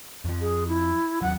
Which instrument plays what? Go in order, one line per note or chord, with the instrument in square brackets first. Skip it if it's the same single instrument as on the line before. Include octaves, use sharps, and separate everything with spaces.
[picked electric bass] F2 F3
[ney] G#4
E4
[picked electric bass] D#2 F#3 [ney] F#5